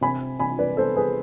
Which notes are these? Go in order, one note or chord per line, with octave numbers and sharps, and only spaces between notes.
C3 G#5 B5
C3 G#5 B5
B4 D5
B3 A4 C5
G#4 B4